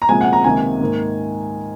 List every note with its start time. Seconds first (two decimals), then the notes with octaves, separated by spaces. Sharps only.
0.02 A#5
0.09 C2 A#2 F3 G#3 G#5
0.21 F#5
0.33 A#5
0.44 C#2 C3 D#3 A#3 G#5
0.80 G#2 D#3 A#3